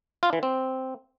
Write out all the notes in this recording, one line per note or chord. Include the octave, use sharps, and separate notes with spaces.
F4
E3
C4